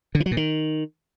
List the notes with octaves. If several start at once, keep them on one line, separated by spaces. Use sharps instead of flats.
D3
E3
F#3
A#2
D#3